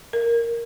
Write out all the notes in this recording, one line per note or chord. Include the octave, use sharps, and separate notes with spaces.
A#4